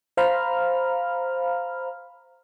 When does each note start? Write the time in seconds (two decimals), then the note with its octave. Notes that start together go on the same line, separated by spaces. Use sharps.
0.17 C5 F5 A#5 B5 F6